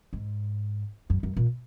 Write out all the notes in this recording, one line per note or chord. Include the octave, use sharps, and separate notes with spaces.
G#2
F#2
F#2
A#2